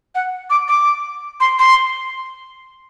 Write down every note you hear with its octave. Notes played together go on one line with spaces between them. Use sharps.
F#5
D6
D6
C6
C6